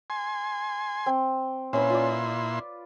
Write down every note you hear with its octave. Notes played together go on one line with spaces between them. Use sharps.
G#5 C6
C4
A#2 C#4 E4 B4 C6
F4 D5